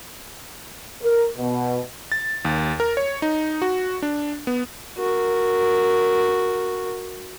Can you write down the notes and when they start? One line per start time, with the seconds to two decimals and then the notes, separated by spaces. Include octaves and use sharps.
1.02 A#4
1.38 B2
2.12 A6
2.45 D#2
2.80 A#4
2.97 C#5
3.22 D#4
3.62 F#4
4.02 D4
4.47 B3
4.98 F#4 A#4